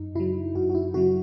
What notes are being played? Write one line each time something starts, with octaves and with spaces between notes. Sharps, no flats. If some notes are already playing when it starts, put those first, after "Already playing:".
Already playing: F#2 D#4
C#3 F#3 E4
F#2 F#4
F#4
E4
C#3 F#3 F#4